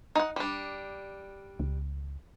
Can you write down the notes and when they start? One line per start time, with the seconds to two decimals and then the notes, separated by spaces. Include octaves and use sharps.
0.15 D#4 F#5
0.36 G3 D4
1.60 C#2